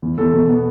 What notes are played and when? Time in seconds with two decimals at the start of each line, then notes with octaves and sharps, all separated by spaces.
0.02 E2
0.18 E2 A4
0.33 B2
0.49 B3